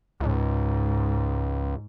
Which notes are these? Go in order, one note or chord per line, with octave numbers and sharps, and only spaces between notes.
C#2 G#2